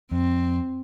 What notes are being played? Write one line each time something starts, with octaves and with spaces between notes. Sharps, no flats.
F2 C4